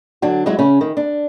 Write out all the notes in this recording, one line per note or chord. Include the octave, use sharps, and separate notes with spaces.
D3 F#3 D4 F#4
F#3 G#3 E4 F#4
C#3 C#4
D#3
D4